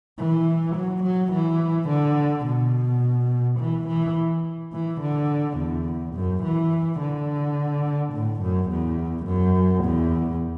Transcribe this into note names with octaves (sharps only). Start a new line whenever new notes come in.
E3
F#3
F#3
E3
D3
B2
E3
E3
E3
D3
E2
F#2
E3
D3
A2
F#2
E2
F#2
E2